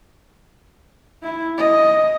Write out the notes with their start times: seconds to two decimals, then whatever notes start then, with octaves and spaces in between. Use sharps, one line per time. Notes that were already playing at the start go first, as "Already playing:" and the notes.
1.22 E4
1.58 D#5